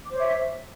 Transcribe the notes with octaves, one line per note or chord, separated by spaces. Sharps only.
C5 C#5 E5 D6